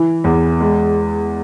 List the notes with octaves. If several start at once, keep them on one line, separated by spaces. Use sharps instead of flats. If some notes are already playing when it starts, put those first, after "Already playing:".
Already playing: E3
E2
G#3